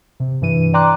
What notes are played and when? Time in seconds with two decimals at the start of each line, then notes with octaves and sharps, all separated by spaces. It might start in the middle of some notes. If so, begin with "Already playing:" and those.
0.20 C3
0.41 G2 E3 D#7
0.73 D5 G5 A#5 C6 D6 F#6